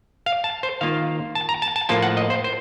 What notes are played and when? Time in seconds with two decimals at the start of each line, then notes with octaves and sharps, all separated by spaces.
0.26 F5
0.44 A5
0.63 C5
0.81 D#3 A#3 F4 F5
1.35 A5
1.49 A#5
1.62 A5
1.76 A5
1.89 A2 F3 A#3 F4 A5
2.03 F#5
2.17 D#5
2.30 C5
2.44 C5